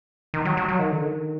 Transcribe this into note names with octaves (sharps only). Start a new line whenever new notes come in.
D#3
F#3
F#3
F#3
D#3
D3
D#3